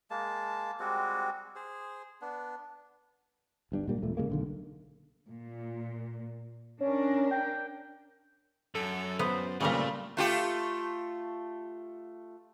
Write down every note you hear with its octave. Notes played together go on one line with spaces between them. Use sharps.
G#3 A#3 A5
G3 G#3 C4 F#4
G#4 C5
B3 D4
G1 G2 D4
A#2 G3 A#3
E1 A#2 A3
C#3 E3 G#3 A#3
B1 D3 D#3
A#2
C#4 D4 A#4
G5
F#2 A4
B3 C5
G2 A#2 C#3 G3 A3 C4 A#4
A3 F4 G4